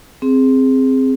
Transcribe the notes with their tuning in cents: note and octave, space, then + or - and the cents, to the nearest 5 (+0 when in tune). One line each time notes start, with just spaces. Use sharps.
C4 +0 G#4 +0